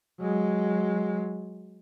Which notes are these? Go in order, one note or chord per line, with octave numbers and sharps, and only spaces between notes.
F#3 G#3